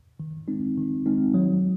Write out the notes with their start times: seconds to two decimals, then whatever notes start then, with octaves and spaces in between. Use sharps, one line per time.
0.20 D#3
0.48 G#3 C4 D#4
0.77 D#3
1.06 G#3 C4 D#4
1.34 F#3